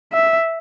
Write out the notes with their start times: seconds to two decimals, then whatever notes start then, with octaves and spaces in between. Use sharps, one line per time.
0.12 E5